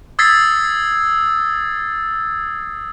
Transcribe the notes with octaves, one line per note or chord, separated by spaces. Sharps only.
D#6 E6 G#6 A6 B6 C7